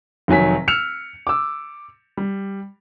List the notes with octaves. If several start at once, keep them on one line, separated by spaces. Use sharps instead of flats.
F1 D#3 F#3 G#5 B6
E6 F6 C#7 E7 F7
D6 E6
G3